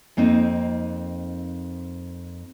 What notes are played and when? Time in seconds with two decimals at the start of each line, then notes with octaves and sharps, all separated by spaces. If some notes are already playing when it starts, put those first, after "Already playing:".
0.17 F2 A#3 C4 D#4